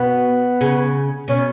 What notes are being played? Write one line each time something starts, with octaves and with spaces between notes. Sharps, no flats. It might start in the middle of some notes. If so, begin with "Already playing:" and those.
Already playing: B2 B3
C#3
B2 C#4